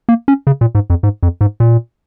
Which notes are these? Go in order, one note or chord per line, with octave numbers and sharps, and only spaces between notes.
A#3
C#4
C#3
A#2
G#2
F2
G#2
F2
G#2
A#2